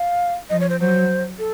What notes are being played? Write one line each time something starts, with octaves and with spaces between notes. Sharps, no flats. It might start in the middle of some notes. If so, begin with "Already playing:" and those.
Already playing: F5
F3 D#5
C#5
C5
F#3 C5
A4